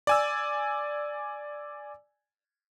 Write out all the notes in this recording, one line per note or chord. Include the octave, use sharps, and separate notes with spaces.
D5 G#5 E6